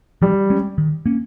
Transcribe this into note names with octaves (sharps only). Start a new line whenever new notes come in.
F3 G3
G#3 C#4
D#3
A#3 C#4